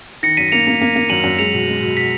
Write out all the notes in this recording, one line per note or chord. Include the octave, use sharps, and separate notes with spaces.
D#3 A#6 C#7
F#2 B6 D#7
A#3 C#7 F7
A#3
A#3
A#3
F#2 D#7 F#7
F#2
G#3 C#7 F7
B2
G#3
B2
B2 B6